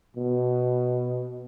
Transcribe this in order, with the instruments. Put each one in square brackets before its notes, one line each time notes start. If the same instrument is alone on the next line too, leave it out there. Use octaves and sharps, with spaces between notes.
[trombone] B2